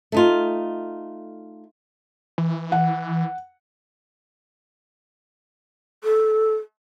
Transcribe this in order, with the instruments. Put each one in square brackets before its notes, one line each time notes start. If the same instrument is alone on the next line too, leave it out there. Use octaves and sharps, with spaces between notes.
[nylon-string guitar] A3 D#4 F4
[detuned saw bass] E3
[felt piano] F#5
[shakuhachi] A4